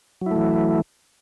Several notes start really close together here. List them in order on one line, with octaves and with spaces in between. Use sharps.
F#3 E4 A3 E3